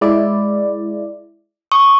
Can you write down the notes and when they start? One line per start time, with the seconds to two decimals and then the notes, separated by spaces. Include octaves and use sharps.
0.01 G#3 E4 D5
1.72 C#6 D#6